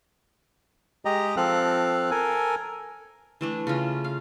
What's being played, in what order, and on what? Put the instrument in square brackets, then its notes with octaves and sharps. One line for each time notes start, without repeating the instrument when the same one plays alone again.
[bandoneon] G#3 G4 D#5 A#5
F3 C4 A4 F5 F#6
A4 A#4 G#5
[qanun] E3 A3 D4
C#3 C#4 F4
F5